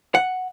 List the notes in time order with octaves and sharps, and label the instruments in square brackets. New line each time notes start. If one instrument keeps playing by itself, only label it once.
[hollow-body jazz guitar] F#5